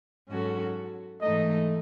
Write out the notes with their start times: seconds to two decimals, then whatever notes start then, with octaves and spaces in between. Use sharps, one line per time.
0.29 G#2 F#3 C#4 F#4 A4
1.21 G#2 E3 A3 D#4 A4 D#5